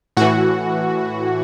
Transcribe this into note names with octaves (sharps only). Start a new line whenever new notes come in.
A2 E3 F#4